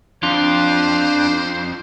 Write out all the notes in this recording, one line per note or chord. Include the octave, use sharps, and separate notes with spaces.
F2 D4 F4 C5